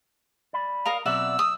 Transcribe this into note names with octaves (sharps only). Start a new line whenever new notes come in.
D5 B5
A#4 D#5 F5 A#5
B2 F#3 C4 D5 E5 F#5 E6
D#6